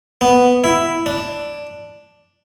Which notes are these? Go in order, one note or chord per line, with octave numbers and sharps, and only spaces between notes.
B3
E4
D4